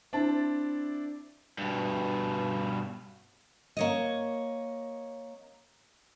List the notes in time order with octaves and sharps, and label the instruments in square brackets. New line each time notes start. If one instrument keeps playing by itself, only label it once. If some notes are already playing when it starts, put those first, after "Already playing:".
[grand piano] C4 D4 E4 D5 A5
[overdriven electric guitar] G2 B2
[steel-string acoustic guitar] A#3 C#5 D#5